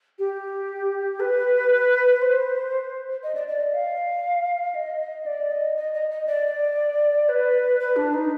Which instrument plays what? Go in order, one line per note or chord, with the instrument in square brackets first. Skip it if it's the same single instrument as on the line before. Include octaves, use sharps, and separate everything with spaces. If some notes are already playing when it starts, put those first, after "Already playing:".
[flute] G4
B4
C5
D#5
D5
D5
D#5
F5
D#5
D5
D#5
D#5
D#5
D#5
D5
B4
B4
D4
D#4